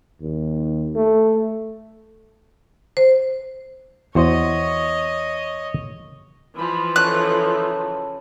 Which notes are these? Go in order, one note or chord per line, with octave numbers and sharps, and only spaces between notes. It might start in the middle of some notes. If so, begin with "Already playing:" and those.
D#2
A3
C5
E2 F#4 C5 C#5 D#5
E3 F3 G#3 B5
C#3 D#4 E4 A4 C#6 F#6